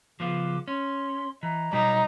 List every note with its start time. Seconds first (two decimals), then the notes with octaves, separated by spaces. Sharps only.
0.20 C#3 F3 B3 F4 D6
0.68 C#4 C6
1.43 E3 D#5 A#5
1.73 B2 F#3 G3 D#4